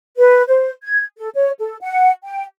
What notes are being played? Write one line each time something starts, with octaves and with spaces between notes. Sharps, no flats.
B4
C5
G#6
A4
C#5
A4
F#5
G5